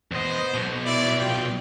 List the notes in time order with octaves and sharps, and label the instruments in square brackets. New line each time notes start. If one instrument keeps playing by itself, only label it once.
[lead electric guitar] E2 D#5 [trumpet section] B3 C5
[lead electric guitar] B1 B2
[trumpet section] E4 D5
F4 G5